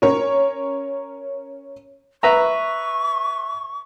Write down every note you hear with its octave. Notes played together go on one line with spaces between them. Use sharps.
C#4 A#4 C#5
B4 E5 A#5 C#6